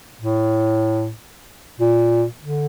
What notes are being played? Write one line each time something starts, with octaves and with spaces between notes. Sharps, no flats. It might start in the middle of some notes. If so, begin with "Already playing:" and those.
A2
A#2
D3